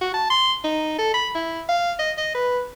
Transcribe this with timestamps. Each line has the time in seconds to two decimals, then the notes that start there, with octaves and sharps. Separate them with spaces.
0.01 F#4
0.14 A5
0.30 C6
0.64 D#4
0.98 A4
1.14 B5
1.35 E4
1.69 F5
1.99 D#5
2.18 D#5
2.35 B4